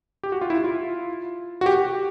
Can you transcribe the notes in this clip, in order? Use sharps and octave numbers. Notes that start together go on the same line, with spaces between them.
G4
F#4
F4
E4
F4
F#4
G4